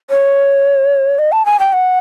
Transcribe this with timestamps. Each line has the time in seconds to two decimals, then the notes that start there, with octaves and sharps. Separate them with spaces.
0.10 C#5
1.19 D#5
1.32 A5
1.46 G#5
1.59 G5
1.73 F#5